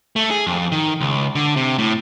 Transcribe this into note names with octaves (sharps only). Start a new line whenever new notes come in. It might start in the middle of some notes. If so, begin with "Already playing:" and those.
A3
G#4
F2
D#3
C#2
D3
C3
A2